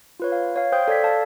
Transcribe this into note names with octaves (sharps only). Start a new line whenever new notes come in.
F4 B4 C#5
F5
C#5 F5
C5 F5 G5 D#6 G6
A4 D5 G#6 B6
F5 A5